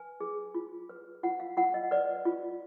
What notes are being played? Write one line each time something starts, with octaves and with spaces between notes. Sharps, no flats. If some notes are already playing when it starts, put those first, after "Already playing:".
Already playing: B4 G#5
G#4
F4
B4
F4 F#5
F5
F4 F#5
D#5
B4 D5
F4